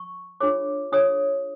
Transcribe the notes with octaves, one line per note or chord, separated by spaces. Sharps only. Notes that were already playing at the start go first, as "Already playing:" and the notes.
Already playing: C#6
D4 F4 G#4 C#5 D6
D4 F4 G#4 C#5 D#6